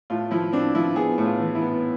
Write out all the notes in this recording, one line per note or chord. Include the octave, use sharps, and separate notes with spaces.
A2 F4
F3 E4
C4 D4
F3 E4
B3 G#4
A2
F4
E3
E4
B3